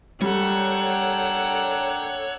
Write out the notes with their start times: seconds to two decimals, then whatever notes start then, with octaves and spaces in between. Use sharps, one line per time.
0.22 G3 D4 A4 A#4 C#5 F#5 G5